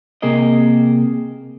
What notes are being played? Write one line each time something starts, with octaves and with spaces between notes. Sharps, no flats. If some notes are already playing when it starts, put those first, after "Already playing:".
C3 A#3 G#4 A#4 D#5